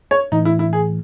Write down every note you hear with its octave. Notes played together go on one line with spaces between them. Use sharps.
C#5
A2 E3 A3 D#4
E4
E4
G#4